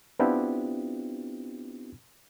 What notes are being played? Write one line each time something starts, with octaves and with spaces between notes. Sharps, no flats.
B3 C4 D4 E4 F4 G4